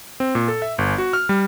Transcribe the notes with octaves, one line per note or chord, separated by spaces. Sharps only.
C4
A#2
A4
E5
G1
F#4
F6
G3